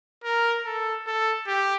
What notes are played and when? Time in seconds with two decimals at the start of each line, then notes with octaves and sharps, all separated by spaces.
0.24 A#4
0.65 A4
1.07 A4
1.47 G4